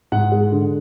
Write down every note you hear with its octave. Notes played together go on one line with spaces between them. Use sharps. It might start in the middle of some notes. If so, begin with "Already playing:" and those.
G#2 F#5
G#3
D3